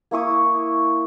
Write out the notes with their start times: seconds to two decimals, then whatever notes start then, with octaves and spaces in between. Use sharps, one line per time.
0.11 A#3 E4 C#6 D#6